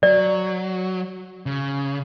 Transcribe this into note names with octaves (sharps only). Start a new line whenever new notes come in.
F#3 D5
C#3